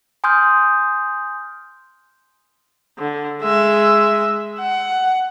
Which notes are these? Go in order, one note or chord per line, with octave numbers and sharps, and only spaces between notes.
G#5 C6 D#6 F6 G6
D3
G#3 E5
F#5